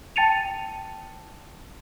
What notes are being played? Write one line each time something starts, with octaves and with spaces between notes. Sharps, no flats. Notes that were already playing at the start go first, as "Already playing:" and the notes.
G5 A5 A6 C#7 D#7 F7